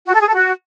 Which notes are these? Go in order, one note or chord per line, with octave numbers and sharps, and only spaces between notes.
F#4
A4
G#4
A4
F#4